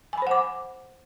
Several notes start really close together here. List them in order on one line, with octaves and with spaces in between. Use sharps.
G#5 B5 C5 F#5 D6